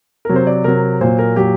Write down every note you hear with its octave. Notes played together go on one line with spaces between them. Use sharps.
C3 F#3 A#4
C5
D5
C3 F#3 A#4
A#2 F#3 C5
A#4
A#2 F#3 G4